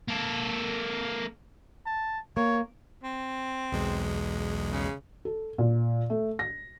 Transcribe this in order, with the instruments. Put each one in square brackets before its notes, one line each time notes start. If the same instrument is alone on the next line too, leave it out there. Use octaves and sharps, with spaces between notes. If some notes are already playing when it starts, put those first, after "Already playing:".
[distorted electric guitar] A#3 A4
[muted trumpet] A5
[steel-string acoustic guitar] A#3 [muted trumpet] C#5
[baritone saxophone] C4
[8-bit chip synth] B1 E2 G#3
[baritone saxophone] C#3
[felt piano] A4
A#2
A3
A#6